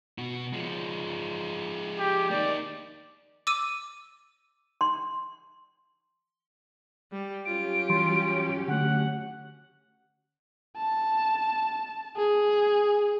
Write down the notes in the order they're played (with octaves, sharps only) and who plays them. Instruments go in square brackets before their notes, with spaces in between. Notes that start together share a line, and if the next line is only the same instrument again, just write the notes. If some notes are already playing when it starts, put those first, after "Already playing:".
[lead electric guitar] B2 F#4
F3 G#3
[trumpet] G4
[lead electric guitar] A#3 D#4 [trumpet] D5
[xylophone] D6 E6 D#7
[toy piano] C6
[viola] G3
[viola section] F#3 C#4 G4 [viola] F4 [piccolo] D7
[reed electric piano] E3 G3 C6
[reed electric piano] D3 A3 [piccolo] F#5
[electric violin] A5
G#4